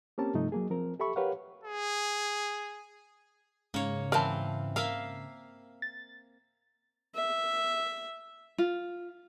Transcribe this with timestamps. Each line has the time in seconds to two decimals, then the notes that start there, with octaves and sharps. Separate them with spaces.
0.18 A#3 C4 C#4 G4 A#4 A5
0.34 G2 C3 F3 A3 D#4
0.52 F#3 A#3 G#4
0.70 F3 C4 A#4
1.00 G4 A4 E5 B5 C#6
1.16 G4 A#4 B4 C#5 F5 F#5
1.63 G#4
3.74 G#2 C#3 A#3 C#5
4.12 E3 C4 A#4 F5 A5
4.76 A#3 A#4 E5 F5
5.82 A6
7.15 E5
8.58 F4